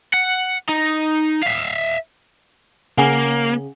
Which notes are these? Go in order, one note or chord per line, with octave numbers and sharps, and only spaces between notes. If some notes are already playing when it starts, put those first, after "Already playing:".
F#5
D#4
E5 F5
C#3 A#3 F#5 G#5 D6